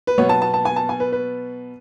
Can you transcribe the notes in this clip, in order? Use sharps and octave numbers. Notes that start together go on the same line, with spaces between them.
B4
B2 F#3 B3 C#5
A5
A5
A5
G#5
A5
G#5
B4
B4